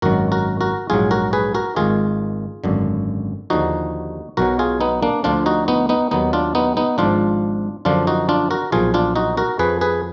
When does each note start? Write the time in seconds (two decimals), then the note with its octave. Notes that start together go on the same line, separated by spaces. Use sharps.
0.02 G#1 F#2 D#3 F#3 F#4 A#4
0.32 F#4 A#4
0.61 F#4 A#4
0.90 A#1 G#2 F#3 F4 G#4
1.11 F#4 A#4
1.33 G#4 B4
1.54 F#4 A#4
1.76 G#1 G#2 D#3 F4 G#4
2.64 G#1 F#2 D3
3.50 D#2 D3 F3 D#4 F#4
4.37 B1 B2 F#3 F#4 A#4
4.59 F4 G#4
4.81 B3 D#4
5.02 A#3 D4
5.24 D2 D3 F3 D4 F4
5.46 D#4 F#4
5.68 B3 D#4
5.89 B3 D#4
6.11 D#2 D#3 F#3 B3 D#4
6.33 D4 F4
6.55 B3 D#4
6.77 B3 D#4
6.98 G#1 G#2 F3 D4 F4
7.85 F#2 D3 F3 D4 F4
8.07 D#4 F#4
8.29 D4 F4
8.51 F#4 A#4
8.72 B1 A#2 F3 F4 G#4
8.94 D4 F4
9.16 D#4 F#4
9.37 F#4 A#4
9.59 F2 F3 G#4 B4
9.81 G#4 B4